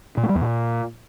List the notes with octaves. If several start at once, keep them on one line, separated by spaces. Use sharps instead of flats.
A#2
A3
G3
E2
A#2